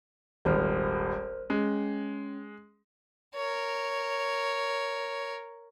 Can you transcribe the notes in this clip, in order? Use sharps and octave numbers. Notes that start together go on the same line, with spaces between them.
D#1 G#1 A#4 C5 F6
G#3 C#4
A#4 C#5